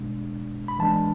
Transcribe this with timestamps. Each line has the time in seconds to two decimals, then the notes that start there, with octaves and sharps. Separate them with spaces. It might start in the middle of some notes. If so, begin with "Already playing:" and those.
Already playing: B2 G#3 D4
0.68 B5
0.79 E3 G#3 D4 A5